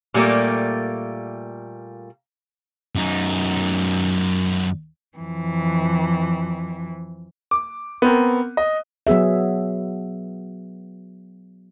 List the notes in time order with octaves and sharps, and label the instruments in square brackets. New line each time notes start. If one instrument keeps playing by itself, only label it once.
[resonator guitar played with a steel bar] A#2 G3 A3 A#3
[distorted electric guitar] F#2 D#4
[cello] F2 E3
[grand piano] D6
B3 C4 A#4
D#5
[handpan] F#3 B3 G#4 E5